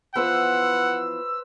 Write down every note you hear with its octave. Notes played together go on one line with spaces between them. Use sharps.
E3 F3 B3 B4 C5 F#5 E6